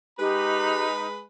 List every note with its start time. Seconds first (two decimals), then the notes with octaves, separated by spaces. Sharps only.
0.19 G#3 D#4 G4 B4 B5